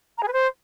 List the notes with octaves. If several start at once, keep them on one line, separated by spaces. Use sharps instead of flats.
A#5
G#4
B4
C5